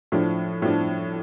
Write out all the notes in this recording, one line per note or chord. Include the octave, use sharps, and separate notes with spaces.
A2 F3 D4
A2 F3 D4